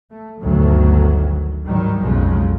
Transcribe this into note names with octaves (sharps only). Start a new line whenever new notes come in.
A3
G1 D2 D#3 F#3
G#2 D#3 F#3 G3
B1 F2 C#3 F3 F#3 G#3